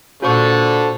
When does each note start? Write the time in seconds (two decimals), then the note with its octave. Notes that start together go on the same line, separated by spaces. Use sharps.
0.22 A#2 D3 F#4 A4 C5 C#6